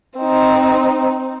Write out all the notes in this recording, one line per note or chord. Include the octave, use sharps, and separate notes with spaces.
C4 D#4